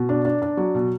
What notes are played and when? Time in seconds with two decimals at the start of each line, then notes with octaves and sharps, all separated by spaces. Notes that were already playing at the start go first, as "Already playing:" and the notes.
Already playing: B2
0.09 D4
0.25 D4
0.42 D4
0.57 F#3
0.75 B2